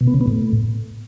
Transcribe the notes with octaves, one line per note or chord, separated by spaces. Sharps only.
B2
B3
C#3
B3
A2